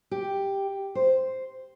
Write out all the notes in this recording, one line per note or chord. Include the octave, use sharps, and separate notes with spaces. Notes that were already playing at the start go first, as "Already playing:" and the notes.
G4
C5